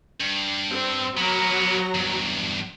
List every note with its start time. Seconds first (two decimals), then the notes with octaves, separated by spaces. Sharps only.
0.20 G2
0.69 C4
1.17 F#3 A#3 B3 A#5
1.95 E2 G2